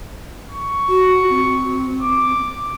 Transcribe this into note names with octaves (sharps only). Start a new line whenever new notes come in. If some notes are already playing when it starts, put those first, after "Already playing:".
C#6
F#4
C4
D6